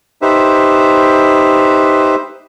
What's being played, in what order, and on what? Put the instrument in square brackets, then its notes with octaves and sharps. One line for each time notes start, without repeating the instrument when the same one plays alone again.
[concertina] D#4 G4 B4 C5 E5